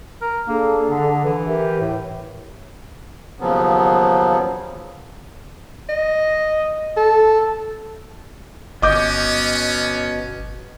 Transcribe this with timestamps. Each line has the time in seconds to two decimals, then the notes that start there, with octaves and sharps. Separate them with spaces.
0.22 A#4
0.48 A#3 D4 G#4 A4
0.90 D3
1.25 E3
1.46 G4 A#4 E5
1.80 A2
3.40 D#2 C#3 F3 F#3 B3
5.89 D#5
6.97 A4
8.82 G1 B2 B3 C#4 D#5 D6 G6